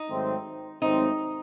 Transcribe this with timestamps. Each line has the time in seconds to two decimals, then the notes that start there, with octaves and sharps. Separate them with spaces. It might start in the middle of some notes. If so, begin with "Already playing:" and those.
Already playing: D#4
0.10 G#2 D#3 F#3 A3 C4
0.82 G#2 D#3 F#3 A3 C4 D#4